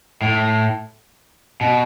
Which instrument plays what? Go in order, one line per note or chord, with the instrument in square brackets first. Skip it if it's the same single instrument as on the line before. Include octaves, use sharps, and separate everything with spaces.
[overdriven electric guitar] A2
B2